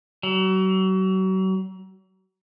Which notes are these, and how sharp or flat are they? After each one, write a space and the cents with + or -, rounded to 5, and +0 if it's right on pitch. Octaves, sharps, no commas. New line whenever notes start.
F#3 +35